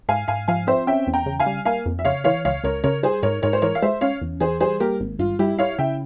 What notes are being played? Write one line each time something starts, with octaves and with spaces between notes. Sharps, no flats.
G#2 F5 G#5
G#2 F5 G#5
F3 F5 G#5
C4 C5 E5
C#4 E5 G5
E2
G5 A#5
C#3
F5 G#5
G3
A#3 F5 G#5
F2
E5
C#3 C#5 F5
E3 C#5 F5
C#2 C#5 F5
C#2 A#4 C#5
C#3 A#4 C#5
G3 G#4 C5
G#2 A#4 C#5
G#2 A#4 C#5
C5
E3 A#4 C#5
F5
G#3 C5 E5
C#4 C#5 F5
E2
E3 G#4 C5
G3 G#4 C5
A#3 G4 A#4
G#1
G2 F4
G3 E4 G4
E4 C#5 F5
C#3 E5 G5